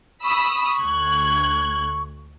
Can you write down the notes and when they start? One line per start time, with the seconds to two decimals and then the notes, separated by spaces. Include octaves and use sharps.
0.24 B5 C#6 D#6 E6
0.79 D2 F#6 G#6